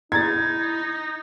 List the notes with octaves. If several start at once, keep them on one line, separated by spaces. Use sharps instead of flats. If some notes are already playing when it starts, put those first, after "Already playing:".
D#4 E4 A#5 G#6 A6